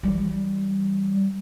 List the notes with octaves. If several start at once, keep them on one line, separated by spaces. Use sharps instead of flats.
E3 G3